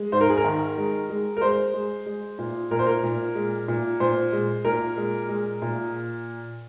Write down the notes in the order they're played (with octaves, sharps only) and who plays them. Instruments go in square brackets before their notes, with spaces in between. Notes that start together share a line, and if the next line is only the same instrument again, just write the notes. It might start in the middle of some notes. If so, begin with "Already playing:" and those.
Already playing: [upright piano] G#3
G#2 C5
A#4
G#4
A#4
D#3
G#3
G#3
A#4
G#3 C5
G#3
G#3
A#2
A#2 A#4
C5
A#4
A#2
G#3
A#2
A#2 C5
G#3
A#2 A#4
G#3
G#3
A#2